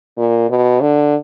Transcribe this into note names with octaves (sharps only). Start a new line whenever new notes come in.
A#2
B2
D3